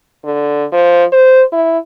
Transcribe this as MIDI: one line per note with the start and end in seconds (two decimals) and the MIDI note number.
0.25 0.65 50
0.73 1.04 53
1.12 1.42 72
1.52 1.78 64